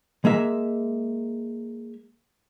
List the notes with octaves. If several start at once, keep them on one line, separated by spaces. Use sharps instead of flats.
G#3 A#3 E5